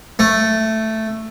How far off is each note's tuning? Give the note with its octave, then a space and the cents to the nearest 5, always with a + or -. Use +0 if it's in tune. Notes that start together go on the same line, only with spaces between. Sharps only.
A3 +5